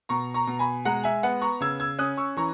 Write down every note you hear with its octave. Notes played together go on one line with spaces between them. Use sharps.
B2 A#5 C#6
A#5 C#6
B2
G#5 B5
G#3 F#5 A#5
E5 G#5
B3 F#5
A#5 C#6
C#3 E6 G#6
E6 G#6
C#4 D#6 F#6
C#6 E6
E3 A#5 C#6